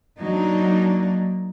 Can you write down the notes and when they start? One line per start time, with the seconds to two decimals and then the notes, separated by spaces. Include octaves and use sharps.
0.19 F#3 A#3 D4 D#4